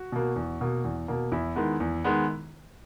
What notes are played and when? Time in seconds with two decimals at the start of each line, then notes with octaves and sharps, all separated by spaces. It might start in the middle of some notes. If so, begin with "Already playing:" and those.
Already playing: F#4
0.12 B2 A#3
0.36 E2
0.61 B2 A#3
0.84 E2
1.08 B2 A#3
1.32 E2 E4
1.56 D#3 G#3 B3
1.80 E2
2.04 D#3 G#3 B3